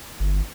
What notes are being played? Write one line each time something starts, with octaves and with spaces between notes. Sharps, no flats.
G1